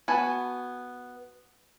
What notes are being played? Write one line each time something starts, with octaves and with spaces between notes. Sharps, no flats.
B3 F#4 G#5 A5